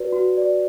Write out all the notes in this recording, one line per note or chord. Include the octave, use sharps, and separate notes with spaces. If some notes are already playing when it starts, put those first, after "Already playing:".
Already playing: F#4 B4 D5
F#4
D5